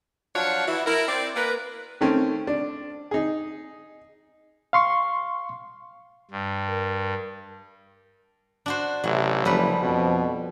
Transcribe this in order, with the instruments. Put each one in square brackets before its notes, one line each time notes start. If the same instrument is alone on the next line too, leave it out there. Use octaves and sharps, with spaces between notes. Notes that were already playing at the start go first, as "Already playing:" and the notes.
[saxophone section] F3 F#3 D4 C#5 F5 F#5
E3 E4 F#4
E4 A#4
C4 D5
A#3 A#4 B4
[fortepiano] D#3 A3 C4 C#4
D4
D#4 G#4
[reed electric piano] F5 C6 C#6
[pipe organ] G2
[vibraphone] A#4
[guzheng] D4 F#4 C5
[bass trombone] A1 [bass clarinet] C3 [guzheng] F#3
[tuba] F#1 [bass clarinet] F3 [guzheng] G3 B4
[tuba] F2 [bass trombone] B2